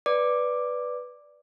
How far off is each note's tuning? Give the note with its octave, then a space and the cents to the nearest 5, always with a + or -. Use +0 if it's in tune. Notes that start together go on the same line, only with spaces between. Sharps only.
B4 +0 D5 +0 D6 +5